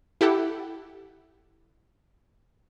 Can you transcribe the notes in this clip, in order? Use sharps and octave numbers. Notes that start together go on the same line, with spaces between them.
E4 G4 A4 F#5